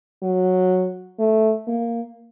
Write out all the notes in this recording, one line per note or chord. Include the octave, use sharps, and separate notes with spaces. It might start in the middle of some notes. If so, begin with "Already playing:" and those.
F#3
A3
A#3